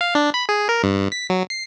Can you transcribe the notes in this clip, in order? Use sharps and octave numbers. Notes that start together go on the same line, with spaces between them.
F5
D4
B5
G#4
A#4
G2
B6
F#3
C7